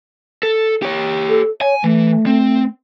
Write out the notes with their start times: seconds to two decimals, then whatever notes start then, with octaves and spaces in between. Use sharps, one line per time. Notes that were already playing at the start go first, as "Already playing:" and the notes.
0.43 A4
0.83 G4 C#5
1.29 A4
1.61 C#5 G#5
1.84 E3 A3
2.26 C4